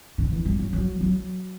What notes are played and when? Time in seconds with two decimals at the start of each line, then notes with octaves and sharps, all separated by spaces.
0.18 D3
0.32 E3
0.46 G3
0.59 F#3
0.73 F#3
1.01 F#3